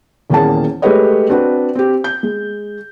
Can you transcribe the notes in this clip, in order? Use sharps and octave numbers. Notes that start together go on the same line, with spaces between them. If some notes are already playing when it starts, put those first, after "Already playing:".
D#1 E2 A#3 C#4 G#4 A5
G#3 A3 G4 B4 C#5 D#5
C4 D4 F#4 B4
C4 G4
G6
G#3